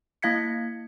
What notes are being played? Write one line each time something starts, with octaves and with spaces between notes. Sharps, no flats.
A#3 E4 F5 G#6 B6 C#7